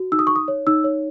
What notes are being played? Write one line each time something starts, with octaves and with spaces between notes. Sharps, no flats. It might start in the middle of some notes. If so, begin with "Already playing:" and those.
Already playing: F#4
D#4 E6
D#6
D#4 C#6
D#6
C#5
D#4 E6
C#5